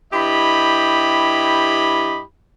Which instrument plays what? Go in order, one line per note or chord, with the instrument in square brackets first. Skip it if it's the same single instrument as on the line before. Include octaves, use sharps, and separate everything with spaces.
[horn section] G2 E4 G4 D#5 B5